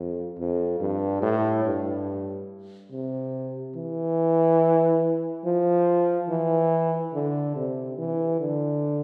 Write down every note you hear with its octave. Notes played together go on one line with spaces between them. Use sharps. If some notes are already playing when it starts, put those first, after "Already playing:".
Already playing: F2
F2
G2
A2
G2
C3
E3
F3
E3
D3
C3
E3
D3